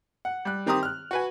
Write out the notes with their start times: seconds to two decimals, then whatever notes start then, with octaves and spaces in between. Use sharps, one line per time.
0.25 F#5
0.45 G3 F#6
0.66 D#3 C4 G4 A#5 C6 D#6
0.83 F6 F#6
1.11 F#4 B4 G#5